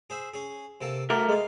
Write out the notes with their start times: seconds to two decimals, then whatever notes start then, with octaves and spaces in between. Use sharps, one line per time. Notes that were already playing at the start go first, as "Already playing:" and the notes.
0.10 G#4 C5 E5
0.34 C#4 G#4
0.81 C3 A#3 A4
1.10 A3 F#4 A#4
1.29 G#3 B3 F5